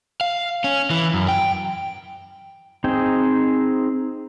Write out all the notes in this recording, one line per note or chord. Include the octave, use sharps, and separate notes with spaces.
F5
C#4
E3
F#2
G5
C4 D#4 G#4 G5